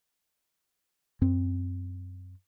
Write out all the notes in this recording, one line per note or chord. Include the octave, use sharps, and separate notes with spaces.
F#2 C4